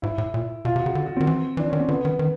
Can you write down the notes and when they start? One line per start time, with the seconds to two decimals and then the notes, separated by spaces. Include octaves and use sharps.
0.02 G#2 E4
0.18 A2
0.34 A#2
0.65 B2 F4
0.76 C3
0.80 F#4
0.86 C#3
0.95 D3
1.06 F#4
1.17 D#3 C4
1.27 E3
1.57 E3 D4
1.69 D#3 C#4
1.80 C4
1.88 D3 B3
2.05 D#3
2.19 D#3